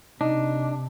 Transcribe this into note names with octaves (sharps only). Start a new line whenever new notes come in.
C3 D4 D#4